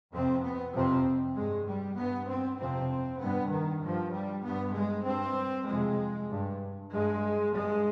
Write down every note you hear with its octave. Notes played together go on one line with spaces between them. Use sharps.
F2 C3 C4
B3
F2 C3 C4
G2 G#3
G3
G2 B3
C4
F2 C3 C4
G2 B3
D#3
G2 F3
G3
G2 B3
G#3
G2 C4
F2 C3 G#3
G2
G2 G#3
G2 G#3